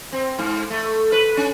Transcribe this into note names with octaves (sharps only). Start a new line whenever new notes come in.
C4
G#2
A3
B4
C#4